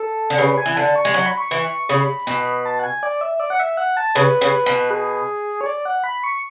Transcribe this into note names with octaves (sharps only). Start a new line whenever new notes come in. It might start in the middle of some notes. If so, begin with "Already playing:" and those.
Already playing: A4
D3
C#3 B4
G#5
E3
D3 A5
C#6
G#3
F#3 C#6
B5
C#6
E3
C#3 B5
B2
A5
F#5
G#5
D5
E5
D5
F#5
E5
F#5
A5
C#3 B4
C#3
B2
G#4
C#5
D5
F#5
B5
C#6